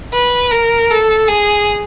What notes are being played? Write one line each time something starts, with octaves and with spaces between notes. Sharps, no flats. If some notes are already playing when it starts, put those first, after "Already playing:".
B4
A#4
A4
G#4